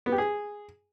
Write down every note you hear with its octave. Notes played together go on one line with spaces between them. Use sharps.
B3
G4
G#4